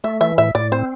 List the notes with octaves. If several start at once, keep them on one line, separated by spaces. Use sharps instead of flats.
A3 E5
E3 E5
A2 E5
A2 D5
C4 C5